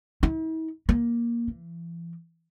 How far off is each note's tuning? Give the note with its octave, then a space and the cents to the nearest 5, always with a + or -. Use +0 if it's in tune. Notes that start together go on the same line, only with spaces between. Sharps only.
E4 -45
A#3 +15
E3 +40